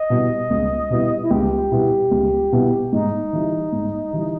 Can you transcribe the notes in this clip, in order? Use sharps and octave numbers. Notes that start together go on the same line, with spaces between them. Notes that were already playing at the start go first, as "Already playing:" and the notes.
Already playing: D#5
B2 G3 B3 E4
C#2
B2 G3 B3 E4
E4
C#2 G4
B2 G3 B3 E4
C#2
B2 G3 B3 E4
G#2 D#4
E3 G3
G#2
E3 G3